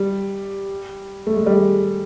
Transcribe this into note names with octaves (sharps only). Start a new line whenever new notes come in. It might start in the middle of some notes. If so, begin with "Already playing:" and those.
Already playing: G3
A3
G#3
G3
G#3